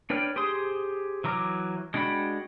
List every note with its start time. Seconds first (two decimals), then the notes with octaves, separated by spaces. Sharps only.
0.10 D4 B4 C#5 G5 F6
0.36 G4 G#4 C5 C6 D#6
1.24 E3 F#3 A#5 D6 F6
1.94 G#3 D4 F#4 G5 B5